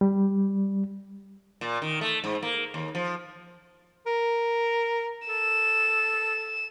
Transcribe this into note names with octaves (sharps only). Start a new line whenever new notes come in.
G3
A#2
D#3
A3
G#2
A#3
D#2
F3
A#4
A4 E7